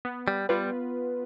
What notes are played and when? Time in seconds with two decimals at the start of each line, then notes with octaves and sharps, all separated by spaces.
0.05 B3
0.28 G3
0.49 G3 F4 B4